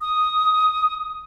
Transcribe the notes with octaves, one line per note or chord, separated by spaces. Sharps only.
D#6